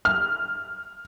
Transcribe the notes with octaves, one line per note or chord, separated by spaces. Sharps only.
F6